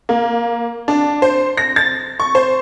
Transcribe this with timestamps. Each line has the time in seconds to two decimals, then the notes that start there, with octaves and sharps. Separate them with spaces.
0.09 A#3
0.88 D4
1.22 C5
1.57 A#6
1.76 A6
2.20 C#6
2.35 C5